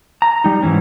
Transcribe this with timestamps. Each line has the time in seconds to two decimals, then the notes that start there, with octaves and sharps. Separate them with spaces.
0.22 A#5
0.44 G3 D#4
0.62 G#2 E3 C#4